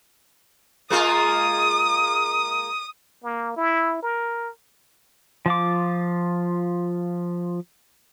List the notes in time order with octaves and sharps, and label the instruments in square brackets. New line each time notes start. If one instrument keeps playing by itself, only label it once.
[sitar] G#3 A#3 F4 [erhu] D#6
[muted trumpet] A#3
E4
A#4
[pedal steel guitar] F3 F4 D6